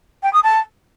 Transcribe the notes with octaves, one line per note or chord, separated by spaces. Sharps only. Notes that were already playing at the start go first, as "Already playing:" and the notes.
G5
D#6
A5